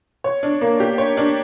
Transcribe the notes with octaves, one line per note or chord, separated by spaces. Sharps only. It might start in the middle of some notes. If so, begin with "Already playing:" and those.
C#5
D4
A#3
G4
C#5
D4